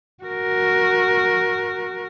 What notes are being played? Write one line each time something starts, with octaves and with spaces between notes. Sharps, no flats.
F#4 A#4